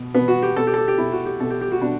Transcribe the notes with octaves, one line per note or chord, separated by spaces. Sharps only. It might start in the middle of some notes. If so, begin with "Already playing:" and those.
Already playing: B2
B2 B3
F#4
G4
B2 A4
G4
A4
G4
G4
B2 E4
F#4
G4
B2 A4
G4
G4
F#4
B2 D4